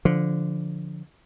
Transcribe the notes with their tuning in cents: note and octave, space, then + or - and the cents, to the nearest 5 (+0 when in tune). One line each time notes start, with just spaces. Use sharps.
D3 -5 F3 +0